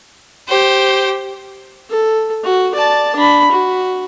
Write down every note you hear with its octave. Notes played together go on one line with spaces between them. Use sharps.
G4 C5 G5
A4
F#4
D5 A5
D4 B5
F#4